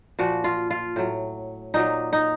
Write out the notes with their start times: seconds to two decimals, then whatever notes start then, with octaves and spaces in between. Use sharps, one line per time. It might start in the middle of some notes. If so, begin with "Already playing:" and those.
0.19 A#2 F3 F#4
0.44 F4
0.71 F4
0.96 A2 F#3
1.74 A#2 F#3 D#4
2.13 D#4